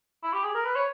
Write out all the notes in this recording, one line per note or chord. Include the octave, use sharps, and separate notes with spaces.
E4
G4
G#4
A#4
B4
C#5